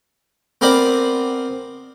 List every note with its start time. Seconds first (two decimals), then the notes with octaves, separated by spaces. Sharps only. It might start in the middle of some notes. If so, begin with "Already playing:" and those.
0.61 B3 C4 A#4 C5 D5 B5